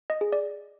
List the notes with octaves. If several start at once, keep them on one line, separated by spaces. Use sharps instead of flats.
D#5
G#4
D5